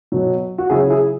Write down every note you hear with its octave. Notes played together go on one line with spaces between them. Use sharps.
B2 F#3
F#4
C#3 F#3 E4 G#4
E4 G#4